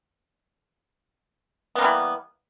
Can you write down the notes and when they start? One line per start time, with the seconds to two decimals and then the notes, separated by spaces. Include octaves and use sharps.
1.75 B3
1.78 A#3
1.81 G3
1.84 E3